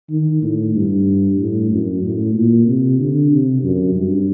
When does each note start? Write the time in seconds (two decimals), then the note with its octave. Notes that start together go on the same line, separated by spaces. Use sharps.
0.10 D#3
0.42 A2
0.75 G2
1.38 A2
1.71 F#2
2.03 A2
2.35 A#2
2.67 C3
2.99 D3
3.31 C3
3.63 F#2
3.95 G2